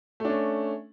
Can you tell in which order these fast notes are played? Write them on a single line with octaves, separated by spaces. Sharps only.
A3 D4 C#4